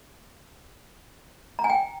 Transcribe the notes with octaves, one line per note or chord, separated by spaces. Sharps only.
A#5
G#5
G5